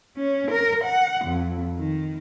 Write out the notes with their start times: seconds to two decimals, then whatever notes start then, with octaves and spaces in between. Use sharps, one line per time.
0.17 C#4
0.51 A#4
0.84 F#5
1.25 F2
1.77 D#3